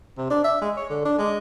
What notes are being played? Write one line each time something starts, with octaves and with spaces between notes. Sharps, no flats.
C3
D4
E5
G#3
C#5
D3
D4
G#3